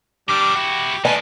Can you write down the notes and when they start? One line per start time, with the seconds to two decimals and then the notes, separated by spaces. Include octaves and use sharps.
0.29 G3 D4 A#4 D6
0.56 E4 F#4 G4
1.05 A2 D#3 B4 D#5 G#5 A5